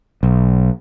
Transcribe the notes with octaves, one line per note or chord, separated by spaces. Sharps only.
B1